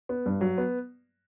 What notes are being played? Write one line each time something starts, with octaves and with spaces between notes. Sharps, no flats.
B3
G2
F#3
B3